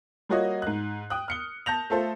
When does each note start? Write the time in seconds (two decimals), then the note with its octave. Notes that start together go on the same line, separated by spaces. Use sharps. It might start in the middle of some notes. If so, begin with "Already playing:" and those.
0.29 G3 A#3 F4 F#4 C#5 D#5
0.62 G#2 F#6
1.10 G5 D#6 F#6
1.28 F6 C#7 G7
1.66 A5 G6 A#6 F7
1.90 A3 F4 A4 C5